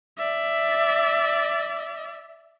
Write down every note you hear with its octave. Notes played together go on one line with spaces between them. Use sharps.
D5 E5